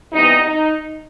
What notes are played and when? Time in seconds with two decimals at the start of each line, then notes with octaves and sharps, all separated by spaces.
0.13 C3 E3 G3 B3 D#4
0.41 D#4